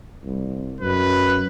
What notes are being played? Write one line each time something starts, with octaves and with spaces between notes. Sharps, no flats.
C2
F#2 B4